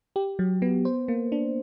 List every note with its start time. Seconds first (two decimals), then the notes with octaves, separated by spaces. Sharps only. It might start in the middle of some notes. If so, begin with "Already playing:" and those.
0.16 G4
0.39 F#3
0.62 B3
0.85 C5
1.08 A#3
1.32 D4